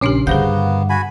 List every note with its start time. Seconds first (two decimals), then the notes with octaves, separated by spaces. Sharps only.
0.01 A#1 C#3 C#4 D4 G4 C7
0.27 G2 D3 A#3 B3 G#4 C5 F#5 G6
0.90 F#4 G#5 B5